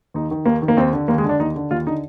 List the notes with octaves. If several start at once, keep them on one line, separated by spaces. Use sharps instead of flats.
D#2 D#4
D#3
D#2 A#3
D#3
A#3
D#2 C4
D3
D#2 A#3
G#3
D3
D4
D#2 D#4
D3
D#2 F4
D3 D#4